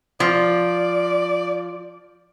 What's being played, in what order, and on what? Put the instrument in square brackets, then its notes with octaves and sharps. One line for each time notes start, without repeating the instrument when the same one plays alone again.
[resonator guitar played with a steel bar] F3 [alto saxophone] D5